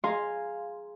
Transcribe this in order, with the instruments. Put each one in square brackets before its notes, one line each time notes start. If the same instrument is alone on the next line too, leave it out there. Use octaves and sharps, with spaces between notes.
[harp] G#4 F5 G#5 A#5 C6